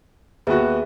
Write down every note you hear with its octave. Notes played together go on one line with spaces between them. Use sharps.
D#2 B3 F#4 G#4 B4 E5